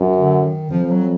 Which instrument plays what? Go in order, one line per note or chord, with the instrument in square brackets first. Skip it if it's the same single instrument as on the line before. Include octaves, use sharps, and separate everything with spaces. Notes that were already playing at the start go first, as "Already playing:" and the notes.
Already playing: [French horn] F#2
[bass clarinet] D3
D#3
[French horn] F2 [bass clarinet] F3
[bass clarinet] F3
F#3